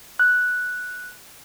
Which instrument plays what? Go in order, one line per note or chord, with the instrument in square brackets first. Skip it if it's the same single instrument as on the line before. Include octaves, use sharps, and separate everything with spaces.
[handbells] F#6